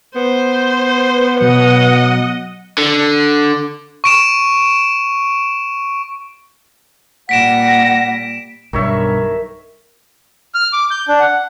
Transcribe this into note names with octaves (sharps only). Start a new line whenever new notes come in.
B3 C5
B2 F#3 D#5 F#5
D3
C#6 D7 E7
A#2 G3 F#5 A#6 B6 D7 E7
B1 G2 D#3 C#5 E5
F6
D6
G6
D4
F#5